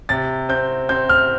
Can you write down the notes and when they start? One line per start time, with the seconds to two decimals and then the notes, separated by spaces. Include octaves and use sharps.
0.09 C3 A6
0.49 C4 G6
0.89 C4 G6
1.09 F6